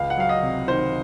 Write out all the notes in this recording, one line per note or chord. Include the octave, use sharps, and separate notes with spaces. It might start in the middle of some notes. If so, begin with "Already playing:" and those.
Already playing: C#2 F5
F#5
F#3 F5
D#5
C3
D#3 C5